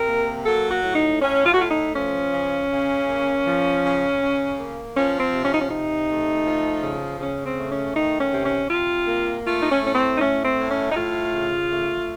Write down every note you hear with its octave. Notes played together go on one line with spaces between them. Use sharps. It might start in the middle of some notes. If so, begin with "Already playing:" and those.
Already playing: C3 A#4
A#3
F#3 A4
F#4
A2
D#4
A2 C#4
F4
F#4
A3 F4
D#4
F3 C#4
C#3
C#3
A#3
F3
C#3
C#3
A#3
F3 C#4
C4
C3
C#4
D#4
C#4
C3 D#4
A3
F3
C#3
C#3 C#4
C4
A3
C#4
D#3 D#4
C#4
C3
C#4
C3 F4
A#3
A3 F4
D#4
C#4
A2 C#4
C4
D#4
A3 C#4
C4
A2
C#4
D#4
A3 F4
C#3
A3